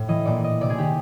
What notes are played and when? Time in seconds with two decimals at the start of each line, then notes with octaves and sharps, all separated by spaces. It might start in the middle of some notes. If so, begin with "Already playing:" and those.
Already playing: A2
0.08 E3 D#5
0.26 A#2 D5
0.44 D#5
0.61 C3 D5
0.70 G#4
0.78 D#3 G4